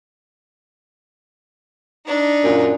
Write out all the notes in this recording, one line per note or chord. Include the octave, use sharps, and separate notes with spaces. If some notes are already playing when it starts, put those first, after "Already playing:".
D4 D#4
F#2 A#2